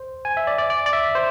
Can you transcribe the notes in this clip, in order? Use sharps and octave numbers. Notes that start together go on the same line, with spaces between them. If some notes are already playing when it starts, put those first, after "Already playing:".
Already playing: C5
G#5
E5
D5
D5
D5
D5
E5
C5